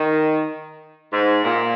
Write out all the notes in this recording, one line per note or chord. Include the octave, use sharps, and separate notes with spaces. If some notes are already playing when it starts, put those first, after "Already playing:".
Already playing: D#3
G#2
A#2